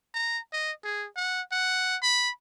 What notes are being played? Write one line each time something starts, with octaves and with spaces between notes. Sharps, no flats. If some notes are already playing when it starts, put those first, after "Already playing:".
A#5
D#5
G#4
F#5
F#5
B5